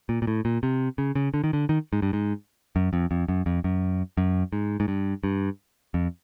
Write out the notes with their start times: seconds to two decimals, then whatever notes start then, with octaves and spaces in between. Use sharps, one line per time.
0.09 A#2
0.22 A#2
0.27 A2
0.45 A#2
0.63 C3
0.98 C#3
1.15 C#3
1.34 D3
1.44 D#3
1.53 D3
1.69 D#3
1.93 G#2
2.02 G2
2.13 G#2
2.76 F#2
2.93 F2
3.11 F2
3.28 F#2
3.46 F2
3.64 F#2
4.17 F#2
4.53 G#2
4.80 G#2
4.88 G2
5.24 G2
5.94 F2